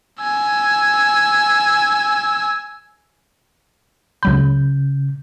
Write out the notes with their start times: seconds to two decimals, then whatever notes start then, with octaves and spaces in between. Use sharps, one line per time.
0.21 G#5 E6
4.23 C#2 C#3 F#3 B5 G6